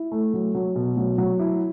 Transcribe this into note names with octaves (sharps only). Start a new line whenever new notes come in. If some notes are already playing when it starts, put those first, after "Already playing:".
Already playing: E4
A3
F#3
F#3
B2
F#3
F#3
E4